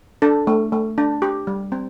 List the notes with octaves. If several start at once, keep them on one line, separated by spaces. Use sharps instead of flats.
D4 A4
A3
A3
D4
G4
G3
C4